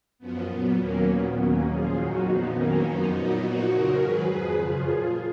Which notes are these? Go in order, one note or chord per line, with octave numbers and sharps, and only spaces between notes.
F#2 F3 B3
A#2 F#3 B3
D#2 D#3 F#3 A#3 C#4
A#2 F#3 B3
D#2 D#3 F#3 A#3 C#4
A#2 F3 F4 G#4
F2 D#3 F#3 D#4 F#4
A#2 F3 B3 D#4
F2 D#3 F#3 A#3 C#4
F#2 F3 B3 D#4
A#2 F#3 B3 D#4
A#2 F3 D#4 F#4
F2 C#3 F#3 F#4 A#4
G#2 D#3 F#3 G#4 B4
F2 F3 G#4 B4
F#2 C#3 F3 F4 G#4
A#2 F3 F4 G#4